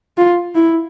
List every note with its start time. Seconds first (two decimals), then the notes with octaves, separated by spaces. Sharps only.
0.17 F4
0.55 E4